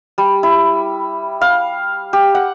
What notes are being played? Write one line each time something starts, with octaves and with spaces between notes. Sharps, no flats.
G3
E4
F5
G4
F#5